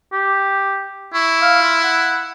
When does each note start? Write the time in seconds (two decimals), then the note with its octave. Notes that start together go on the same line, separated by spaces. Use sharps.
0.12 G4
1.14 E4 C#6
1.41 F5
1.62 F4
1.83 F#5